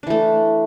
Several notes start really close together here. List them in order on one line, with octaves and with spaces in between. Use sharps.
D4 E3 A3